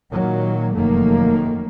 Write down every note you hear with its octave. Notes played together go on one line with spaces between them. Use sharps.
A#2 D#3 F#3 A#3
F1 F#2 D#3 A3 A#3